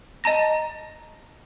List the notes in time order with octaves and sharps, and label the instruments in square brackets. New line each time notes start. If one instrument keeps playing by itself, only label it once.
[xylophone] D#5 A5 A#5 A#6